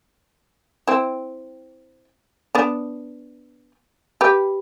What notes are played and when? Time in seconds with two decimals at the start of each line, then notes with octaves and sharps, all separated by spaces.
0.87 C4 E4
2.55 B3 D4
4.21 G4 B4